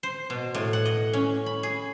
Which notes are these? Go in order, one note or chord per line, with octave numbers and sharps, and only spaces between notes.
C5
B2
A2
F#5
D#5
C#4
B5
G#4